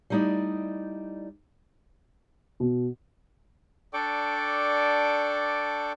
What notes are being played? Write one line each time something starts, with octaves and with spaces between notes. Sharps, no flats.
G3 A3 D#4 E4 D5 D#5
B2
D4 A4 D5 G5 C#6 D6